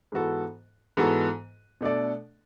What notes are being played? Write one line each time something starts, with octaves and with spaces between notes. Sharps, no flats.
G#2 E3 B3 F#4 A4
G#2 E3 B3 F#4 A4
B2 A3 D4 A4 D5